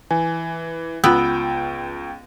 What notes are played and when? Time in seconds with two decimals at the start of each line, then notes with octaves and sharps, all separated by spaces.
0.11 E3 G#5
1.04 C#2 B3 F4 G5 E6